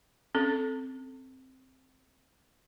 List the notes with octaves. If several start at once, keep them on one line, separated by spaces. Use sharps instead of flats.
C4 C#4 A4